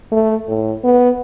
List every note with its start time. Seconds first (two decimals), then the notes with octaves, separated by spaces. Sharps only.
0.12 A3
0.48 A2
0.84 B3